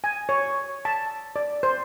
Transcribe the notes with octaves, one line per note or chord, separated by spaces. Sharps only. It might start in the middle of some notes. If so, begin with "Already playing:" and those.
G#5
C#5
A5
D5
C5